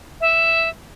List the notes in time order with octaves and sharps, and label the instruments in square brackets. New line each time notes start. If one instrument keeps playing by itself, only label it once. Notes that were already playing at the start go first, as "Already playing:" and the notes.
[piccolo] E5